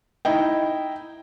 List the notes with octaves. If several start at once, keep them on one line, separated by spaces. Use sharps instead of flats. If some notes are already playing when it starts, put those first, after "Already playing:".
D#4 E4 D#5 G5